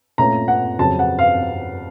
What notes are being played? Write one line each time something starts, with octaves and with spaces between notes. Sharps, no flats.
A#2 A3 C#4 F4 A#5
F#5
F2 C#3 F#3 A5
F#5
F5